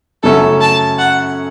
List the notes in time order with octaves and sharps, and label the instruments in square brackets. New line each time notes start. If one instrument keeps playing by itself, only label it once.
[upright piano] F#2 C#3 F#3 A3 C#4 [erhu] A4
[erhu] A5
F#5